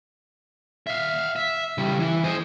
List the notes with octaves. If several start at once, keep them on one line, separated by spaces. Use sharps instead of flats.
E5 F5
E5
C#3 G3
E3
C5 D#5